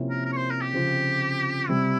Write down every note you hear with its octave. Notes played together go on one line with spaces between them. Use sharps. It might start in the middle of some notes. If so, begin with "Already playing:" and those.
Already playing: C3 F3 A#3 C#4 E4
A#4
A#4
C#5
C5
A#4
G4
C#3 F3 C4 F4
C3 G3 C4 E4